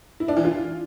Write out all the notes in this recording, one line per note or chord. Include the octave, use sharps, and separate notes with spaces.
E4
D4
E3
F4